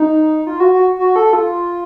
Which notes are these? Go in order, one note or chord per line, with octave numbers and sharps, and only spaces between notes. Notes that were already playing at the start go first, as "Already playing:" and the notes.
Already playing: D#4
F4
F#4
F#4
F#4
A4
F4